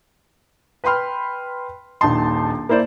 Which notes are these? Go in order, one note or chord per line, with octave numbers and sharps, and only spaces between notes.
B4 G5 B5 C6 F6
D#1 A#1 D#4 A5 C6
A#3 E4 C5 D5